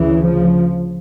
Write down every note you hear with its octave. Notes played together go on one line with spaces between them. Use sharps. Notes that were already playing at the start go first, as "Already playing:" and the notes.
Already playing: D2 C#3 E3
F3